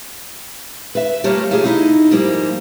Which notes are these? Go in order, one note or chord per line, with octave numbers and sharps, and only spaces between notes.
B4 E5
G3 A3 A#3 F4 G4 C#5
A3 A#3 F4 G4 G#4
D#4 E4 D#5
G#2 F3 G3 A#3